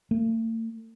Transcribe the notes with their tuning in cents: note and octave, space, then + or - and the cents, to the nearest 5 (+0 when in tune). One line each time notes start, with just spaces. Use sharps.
A3 +45